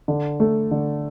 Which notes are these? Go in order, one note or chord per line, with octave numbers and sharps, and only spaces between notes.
D3
A3
D3